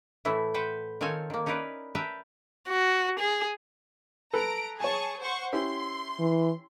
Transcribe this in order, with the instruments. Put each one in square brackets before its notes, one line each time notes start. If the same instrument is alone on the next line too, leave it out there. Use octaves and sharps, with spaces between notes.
[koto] A2 E3 A3 E4
B4 C5 F#5 G5
D#3 C4 F4 A4 C#5 G#5
D#3 A#3
C#4 D#4 E4 A#4 B4 D5
A#4 B4 E5 G5 A5
[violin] F#4
G#4
[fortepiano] A4 B4 [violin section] A#5 D7
[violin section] G#4 A5 C#6 [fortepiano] C#5 G#5
[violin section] C5 F#5 C#6
[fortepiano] C#4 E4 G4 [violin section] C6
[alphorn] E3